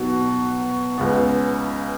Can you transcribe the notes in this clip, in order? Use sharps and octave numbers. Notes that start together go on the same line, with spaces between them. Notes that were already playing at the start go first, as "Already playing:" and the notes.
Already playing: B2 F#3 D#4 F#4
C#2 C#3 B3